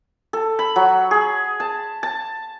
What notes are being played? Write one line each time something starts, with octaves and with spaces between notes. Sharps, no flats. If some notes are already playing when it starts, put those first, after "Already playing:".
A4
B5
F#3
G#4
A5
A5